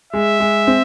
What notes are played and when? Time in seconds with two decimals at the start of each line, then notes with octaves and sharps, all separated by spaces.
0.13 G#3 E5
0.40 G#3
0.67 C4